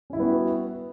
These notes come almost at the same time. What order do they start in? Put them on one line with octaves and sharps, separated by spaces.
C#4 E4 G3 B3 F#4